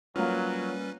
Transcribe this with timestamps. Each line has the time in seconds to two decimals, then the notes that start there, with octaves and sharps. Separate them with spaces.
0.16 F#3 G3 A#3 C#4 F4 B4 F6